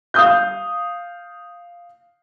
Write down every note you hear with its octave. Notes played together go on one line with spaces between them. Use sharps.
F5 D#6 G6